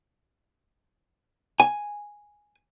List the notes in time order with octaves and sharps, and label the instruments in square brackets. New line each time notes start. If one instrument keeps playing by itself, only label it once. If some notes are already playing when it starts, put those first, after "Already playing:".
[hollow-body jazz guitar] G#5